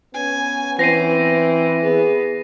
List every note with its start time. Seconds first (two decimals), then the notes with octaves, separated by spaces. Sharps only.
0.14 B3 C#4 G#5
0.79 E3 C4 A#6 C7 D#7
1.83 B3 G#4